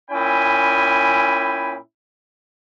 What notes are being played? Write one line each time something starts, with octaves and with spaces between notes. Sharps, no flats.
A#2 C#4 E4 G5 G#5 B5